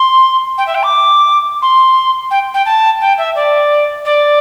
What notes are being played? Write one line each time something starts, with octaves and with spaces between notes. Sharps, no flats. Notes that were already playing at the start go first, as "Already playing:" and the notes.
Already playing: C6
G5
E5
G5
D6
C6
G5
G5
A5
G5
E5
D5
D5